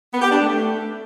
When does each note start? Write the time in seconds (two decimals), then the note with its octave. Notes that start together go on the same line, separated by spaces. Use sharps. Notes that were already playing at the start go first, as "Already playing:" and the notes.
0.12 B3
0.22 G4
0.31 D4
0.40 A3